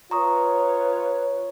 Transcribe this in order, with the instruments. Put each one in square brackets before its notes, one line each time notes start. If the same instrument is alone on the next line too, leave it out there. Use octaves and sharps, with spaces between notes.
[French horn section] F4 B4 C#5 [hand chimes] A#5 C#6 D#6